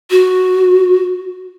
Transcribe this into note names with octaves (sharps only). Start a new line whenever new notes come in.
F#4